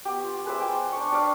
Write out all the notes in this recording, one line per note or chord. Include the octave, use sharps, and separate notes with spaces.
B3 G4
F4
G#4 B4 C5 E5
F4 G5 G#5 D6
D4 C#6
D4 B4 D5 F5